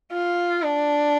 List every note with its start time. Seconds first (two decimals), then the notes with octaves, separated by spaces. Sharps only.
0.12 F4
0.62 D4